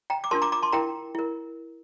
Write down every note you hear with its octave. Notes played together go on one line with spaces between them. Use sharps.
G5 A#5
D6
D4 F4 A#4 A5 C6
A#5 D6
A#5 D6
A5 C6
E4 A#4 G5 A#5
E4 A#4